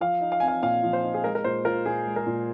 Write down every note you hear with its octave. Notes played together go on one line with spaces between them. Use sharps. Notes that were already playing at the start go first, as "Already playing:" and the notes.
F3 F5
D#4
F5
C4 G#5
F5
A#2 F5
F3
C5
D#4
G#4
G#3 A#4
A#4
A#2 C5
F4 A#4
A#2 G#4
G#3
A#4
A#2